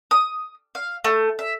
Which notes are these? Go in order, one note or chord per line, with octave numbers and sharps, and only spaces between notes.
D#6
F5
A3
E5